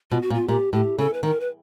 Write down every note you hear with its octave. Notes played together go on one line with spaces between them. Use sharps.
B2 F4
F#4
A#2
F4
A#2 G4
A2 G4
C#3 A4
B4
D#3 A#4
B4